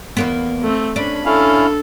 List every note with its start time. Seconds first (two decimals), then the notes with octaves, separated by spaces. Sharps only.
0.17 E2 A#3 B3
0.62 A3 C4
0.96 C#4 D4 B5
1.25 C#4 E4 A4 F5